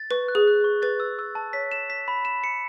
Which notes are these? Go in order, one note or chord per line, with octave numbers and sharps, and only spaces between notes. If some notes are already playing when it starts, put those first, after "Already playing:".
Already playing: A6
B4 C#6
F#6
G#4
F#6
C#6
B4 A6
E6
E6
A5
C#5 B6
E7
B6
B5
E7
C#7